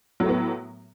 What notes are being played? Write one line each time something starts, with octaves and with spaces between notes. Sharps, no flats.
A2 F#3 A3 B3